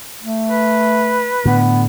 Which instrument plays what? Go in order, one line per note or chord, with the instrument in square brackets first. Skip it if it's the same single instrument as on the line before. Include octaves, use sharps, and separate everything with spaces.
[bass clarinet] A3
[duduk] B4
[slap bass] A2 D3 [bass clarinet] B3